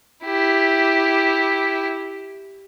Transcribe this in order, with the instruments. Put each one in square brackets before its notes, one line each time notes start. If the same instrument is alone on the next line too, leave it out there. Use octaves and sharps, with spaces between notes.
[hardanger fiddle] E4 G4